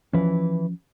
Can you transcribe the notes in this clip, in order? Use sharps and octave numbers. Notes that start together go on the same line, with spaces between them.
E3 F3 C#4 B4